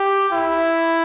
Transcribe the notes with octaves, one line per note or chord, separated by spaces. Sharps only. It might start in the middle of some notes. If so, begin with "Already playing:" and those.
Already playing: G4
E4